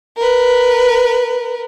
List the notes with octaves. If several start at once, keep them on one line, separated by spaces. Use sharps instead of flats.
A#4 B4